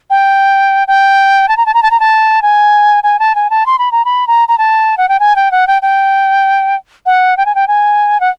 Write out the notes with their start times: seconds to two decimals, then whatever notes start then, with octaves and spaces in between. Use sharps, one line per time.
0.10 G5
0.88 G5
1.48 A5
1.57 A#5
1.66 A5
1.74 A#5
1.83 A5
1.91 A#5
2.00 A5
2.42 G#5
3.03 G#5
3.19 A5
3.35 G#5
3.50 A5
3.66 C6
3.79 B5
3.92 A#5
4.05 B5
4.27 A#5
4.48 A#5
4.58 A5
4.98 F#5
5.09 G5
5.20 G#5
5.36 G5
5.51 F#5
5.67 G5
5.82 G5
7.06 F#5
7.37 G5
7.46 G#5
7.55 G5
7.68 G#5
8.20 F#5